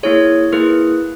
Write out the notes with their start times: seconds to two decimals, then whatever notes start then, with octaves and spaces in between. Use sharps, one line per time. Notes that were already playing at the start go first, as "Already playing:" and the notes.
0.03 A#3 E4 G#4 C#5
0.52 A#3 E4 G#4 B4